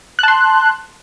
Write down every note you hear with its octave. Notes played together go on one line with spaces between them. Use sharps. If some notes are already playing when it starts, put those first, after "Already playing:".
A5 C6 F#6